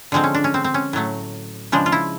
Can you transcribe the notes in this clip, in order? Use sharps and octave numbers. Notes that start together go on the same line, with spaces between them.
D3 F3 G#3 C4
C#4
D4
C#4
C4
C4
C#4
A2 F#3 A3
C#3 F3 G#3 D4
F4
E4